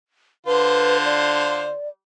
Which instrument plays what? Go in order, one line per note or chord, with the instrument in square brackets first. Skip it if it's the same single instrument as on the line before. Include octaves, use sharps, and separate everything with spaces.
[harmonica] D3 F4 C5 [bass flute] B4
[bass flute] D5